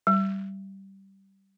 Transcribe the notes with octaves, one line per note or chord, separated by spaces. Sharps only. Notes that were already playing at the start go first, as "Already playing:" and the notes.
G3